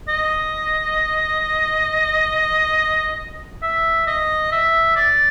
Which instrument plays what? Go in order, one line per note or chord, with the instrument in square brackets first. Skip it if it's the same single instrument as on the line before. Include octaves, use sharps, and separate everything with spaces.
[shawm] D#5
E5
D#5
E5
D5